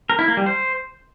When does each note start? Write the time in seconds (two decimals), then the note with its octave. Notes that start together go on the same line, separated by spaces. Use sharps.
0.10 A#4
0.19 E4
0.28 A#3
0.37 G3
0.46 C5